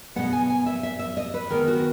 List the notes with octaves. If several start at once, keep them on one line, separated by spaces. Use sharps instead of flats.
B2 G#3 B3 F#5
G#5
G#5
E5
E5
E5
D#5
B4
D#3 G#3 B3 A#4
F#4